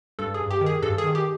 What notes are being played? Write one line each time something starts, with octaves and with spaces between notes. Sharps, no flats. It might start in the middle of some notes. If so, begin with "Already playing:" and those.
G2 A4
G#4
G2
G4
D#3
G#4
G2 A4
G#4
D#3
G4